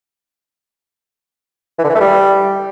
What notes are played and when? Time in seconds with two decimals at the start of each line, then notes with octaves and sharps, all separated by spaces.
1.78 E3
1.84 D3
1.89 E3
1.95 A3
2.01 G3